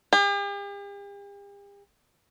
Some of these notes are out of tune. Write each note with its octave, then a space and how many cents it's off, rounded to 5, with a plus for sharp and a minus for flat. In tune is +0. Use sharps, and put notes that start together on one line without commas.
G4 +45